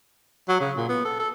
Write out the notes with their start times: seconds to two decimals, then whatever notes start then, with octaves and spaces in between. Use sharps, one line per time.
0.49 F#3
0.61 C#3
0.77 A#2
0.89 B3
1.05 A4
1.19 A4